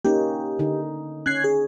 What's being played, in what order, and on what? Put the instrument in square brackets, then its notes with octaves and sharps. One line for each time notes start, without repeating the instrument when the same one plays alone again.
[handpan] A#3 C#4 D#4 [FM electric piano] G4
[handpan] D3 D#4
[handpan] C#4 [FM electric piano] F#6 G#6 C7
[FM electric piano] G#4